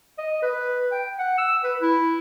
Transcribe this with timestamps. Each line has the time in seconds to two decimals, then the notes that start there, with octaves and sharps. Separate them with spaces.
0.18 D#5
0.42 B4
0.92 G5
1.19 F#5
1.38 E6
1.64 B4
1.81 E4